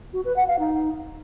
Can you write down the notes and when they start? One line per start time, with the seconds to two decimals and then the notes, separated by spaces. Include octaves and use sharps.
0.13 F#4
0.25 B4
0.36 F#5
0.48 F5
0.59 D#4